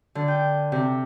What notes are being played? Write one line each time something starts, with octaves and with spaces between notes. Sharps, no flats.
D3
G5
C3